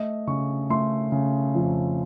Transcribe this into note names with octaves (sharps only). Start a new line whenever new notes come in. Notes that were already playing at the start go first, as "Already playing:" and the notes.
Already playing: A3 D#5
C#3 C#6
A3 C6
C#3
F2